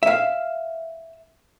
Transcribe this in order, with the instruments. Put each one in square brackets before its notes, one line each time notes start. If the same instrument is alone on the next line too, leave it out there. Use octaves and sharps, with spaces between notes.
[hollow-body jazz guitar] E5 F5